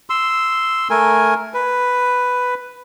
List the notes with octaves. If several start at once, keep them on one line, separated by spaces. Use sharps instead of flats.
C6 E6
A3 A#4 G#5
B4